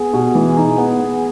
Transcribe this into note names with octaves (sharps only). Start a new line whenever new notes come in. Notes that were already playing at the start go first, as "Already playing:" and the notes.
Already playing: B3 G#4
B2
E3
D#4
B3
B3